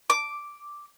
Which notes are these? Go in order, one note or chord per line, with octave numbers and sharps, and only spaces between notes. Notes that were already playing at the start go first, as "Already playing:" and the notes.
D6